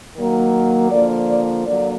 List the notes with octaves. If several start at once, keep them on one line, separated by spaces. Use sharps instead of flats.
D#3 F#3 A#3
D3 F3 A#3 D5
D5
D3 F#3 A#3 D5